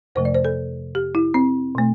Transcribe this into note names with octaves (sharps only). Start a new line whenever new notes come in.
F2 C3 F3 A3 C5
D5
C5
A4
G4
E4
C4
B2 A3